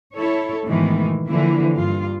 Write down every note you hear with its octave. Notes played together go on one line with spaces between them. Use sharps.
E4 A4 C#5
G#2 B2 D#3 E3 G#3 A3
D3 E3 F3 A#3 E4
G2 F4